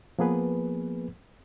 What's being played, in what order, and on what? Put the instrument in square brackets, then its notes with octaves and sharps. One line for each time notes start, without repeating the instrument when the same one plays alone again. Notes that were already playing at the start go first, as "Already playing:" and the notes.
[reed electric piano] F3 A#3 B3 G#4 B4